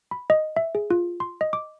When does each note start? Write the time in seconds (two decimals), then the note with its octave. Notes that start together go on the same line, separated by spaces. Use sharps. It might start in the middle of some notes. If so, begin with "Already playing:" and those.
0.11 B5
0.30 D#5
0.56 E5
0.75 G#4
0.90 F4
1.20 C6
1.41 D#5
1.53 D6